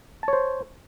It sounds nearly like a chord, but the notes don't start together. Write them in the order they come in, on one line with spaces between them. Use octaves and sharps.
A5 C#5 C5